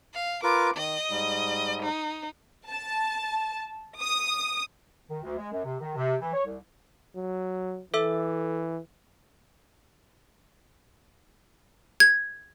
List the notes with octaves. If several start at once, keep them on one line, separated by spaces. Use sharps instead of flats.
F5
F4 A#4 B4 D6
D#3 D#5
G#2 G3
D#4
A5
D#6
D#3
D2
G#3
F#2
C3
D#3
C3
E3
C#5
C2
F#3
E3 A4 E5 E6
G#6